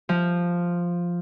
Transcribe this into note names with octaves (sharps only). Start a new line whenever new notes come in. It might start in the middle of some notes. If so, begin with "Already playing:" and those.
F3